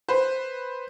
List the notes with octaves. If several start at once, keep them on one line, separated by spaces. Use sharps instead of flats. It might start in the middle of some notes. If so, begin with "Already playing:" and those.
B4 C5